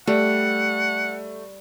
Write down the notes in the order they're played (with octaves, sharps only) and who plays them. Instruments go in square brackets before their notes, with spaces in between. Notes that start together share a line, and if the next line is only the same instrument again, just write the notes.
[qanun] G3 [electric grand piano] A3 [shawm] F#5